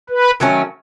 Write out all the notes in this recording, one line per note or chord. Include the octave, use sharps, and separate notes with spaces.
B4
D#3 F#3 A3 C#4